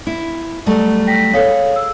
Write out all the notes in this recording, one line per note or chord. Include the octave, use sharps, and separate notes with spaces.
E4
F#3 G3 A3
G5 A#6 B6
G#4 A4 B4 C#5 F5
E6